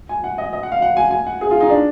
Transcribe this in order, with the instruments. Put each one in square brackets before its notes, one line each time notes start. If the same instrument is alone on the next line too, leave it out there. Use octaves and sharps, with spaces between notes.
[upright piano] G#5
F#5
D#5
D#5
F#5
F5
F#5
G#5
G#5
F#5
G#4
F4
D#4
D4